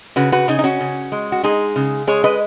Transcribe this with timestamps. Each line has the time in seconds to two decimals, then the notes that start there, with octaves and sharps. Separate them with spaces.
0.16 C#3 F#4 B4
0.32 F#4 B4
0.48 C#3 D#4 G#4
0.59 D#4
0.64 C#4 F#4
0.81 C#3
1.12 G#3
1.32 F#4
1.43 G#3 D#4 G#4
1.76 C#3
2.07 G#3 G#4 C#5
2.24 B4 D#5